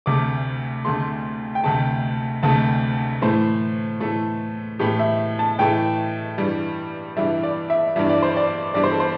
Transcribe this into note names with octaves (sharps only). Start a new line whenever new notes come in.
D2 C3 A3 D6
D2 C3 A3 C6
G5
D2 C3 A3 A5
D2 C3 A3 A5
A2 E3 A3 C5
A2 E3 A3 A4
A2 E3 A3 G4
E5
A5
A2 E3 A3 G5
G2 E3 G3
G2 E3 G3 E5
D5
E5
G2 E3 G3 E5
D5
C5
D5
G2 E3 G3 D5
C5
A4
C5